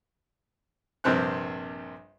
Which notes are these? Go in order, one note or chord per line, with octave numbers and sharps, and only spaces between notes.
A#1 G2 C3 C4 C5 F#6